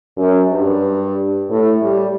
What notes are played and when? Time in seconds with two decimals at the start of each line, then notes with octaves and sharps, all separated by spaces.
0.17 F#2
0.50 G2
1.50 A2
1.83 G3